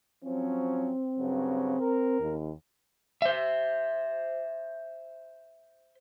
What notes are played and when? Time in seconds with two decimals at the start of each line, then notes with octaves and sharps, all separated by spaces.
0.24 F3 F#3 C4 C#4
1.18 G2 C#3 F#3
1.80 A#4
2.20 D#2
3.22 C5 E5